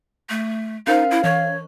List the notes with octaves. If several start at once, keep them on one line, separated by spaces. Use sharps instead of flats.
A3
C#4 D#4 A#4 C5 F5
E4
E3 C#5 C#6